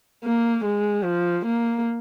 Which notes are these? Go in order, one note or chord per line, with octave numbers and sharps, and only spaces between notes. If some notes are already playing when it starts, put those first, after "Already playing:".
A#3
G#3
F3
A#3